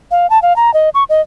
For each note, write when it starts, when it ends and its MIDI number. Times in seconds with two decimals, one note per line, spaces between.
0.11 0.29 77
0.30 0.41 81
0.42 0.55 77
0.56 0.73 82
0.74 0.89 75
0.94 1.04 85
1.09 1.21 75